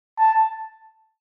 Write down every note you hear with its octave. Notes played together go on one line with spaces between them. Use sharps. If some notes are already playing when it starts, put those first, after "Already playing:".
A5